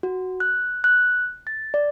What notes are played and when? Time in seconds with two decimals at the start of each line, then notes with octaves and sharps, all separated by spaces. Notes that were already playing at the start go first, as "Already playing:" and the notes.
0.03 F#4
0.40 F#6
0.84 F#6
1.47 A6
1.74 D5